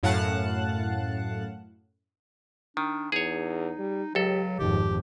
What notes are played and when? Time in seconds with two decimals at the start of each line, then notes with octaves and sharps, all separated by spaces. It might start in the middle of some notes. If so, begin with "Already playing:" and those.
0.03 F#2 A2 F5 F#5 A5 F#6
2.77 D#3 D4
3.12 E2 D#4 G#4 C#5
3.79 G3
4.15 C#2 F#3 G4 A4
4.59 G#1 F2 D#3 G4